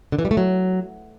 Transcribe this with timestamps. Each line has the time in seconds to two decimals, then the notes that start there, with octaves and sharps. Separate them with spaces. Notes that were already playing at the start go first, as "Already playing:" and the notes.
0.12 D3
0.19 E3
0.25 G3
0.31 A3
0.37 F#3